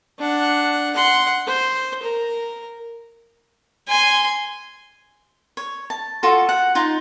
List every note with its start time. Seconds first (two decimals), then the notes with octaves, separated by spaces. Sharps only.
0.19 D4 F#5
0.94 F#5 C6
1.46 C5
2.02 A#4
3.89 G#5 C6
5.57 C#5
5.90 A5
6.23 F4 F#4 A4
6.49 F#5
6.75 D#4 F4